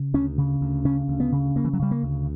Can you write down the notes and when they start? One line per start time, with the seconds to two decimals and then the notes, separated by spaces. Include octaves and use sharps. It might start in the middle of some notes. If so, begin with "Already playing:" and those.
Already playing: C#3
0.14 D2 C#4
0.38 C#3
0.61 D2
0.85 C#3 C#4
1.08 D2
1.20 B3
1.32 C#3
1.55 D2 A#3
1.64 E3
1.73 F#3
1.79 C#3 G3
1.91 A#3
2.03 D2